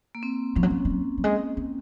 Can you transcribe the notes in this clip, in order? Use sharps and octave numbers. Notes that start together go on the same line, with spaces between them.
A#3
C4
F3 C#4
F#3
F3
G#3
F#3
F#3
G#3
C4